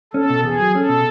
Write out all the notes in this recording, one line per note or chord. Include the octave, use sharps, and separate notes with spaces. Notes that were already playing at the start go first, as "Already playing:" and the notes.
C#4 A4
B2
E2 G#4
F#3
C#4 A4
B2